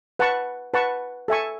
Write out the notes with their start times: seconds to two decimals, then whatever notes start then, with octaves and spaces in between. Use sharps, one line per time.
0.19 B4 F#5 A5 C#6
0.74 B4 F#5 A5 C#6
1.28 A4 E5 G#5 C#6